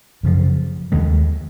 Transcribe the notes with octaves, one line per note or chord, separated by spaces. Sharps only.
F#2 C#3 F3
D#2 D#3 G#3